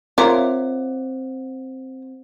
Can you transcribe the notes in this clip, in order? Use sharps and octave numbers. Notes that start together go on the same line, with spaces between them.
C4 F4 A#4 C#5 E5 D6